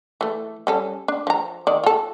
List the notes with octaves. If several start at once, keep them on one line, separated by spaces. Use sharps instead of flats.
E3 A3
G3 C#4 A4
D4
F3 A#5
D#3 D5
F4 A4